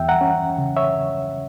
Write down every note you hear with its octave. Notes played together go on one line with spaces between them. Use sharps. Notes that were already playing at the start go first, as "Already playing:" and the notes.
Already playing: E2 E5 G5
F#5 A#5
C#4
C#3
C#5 E5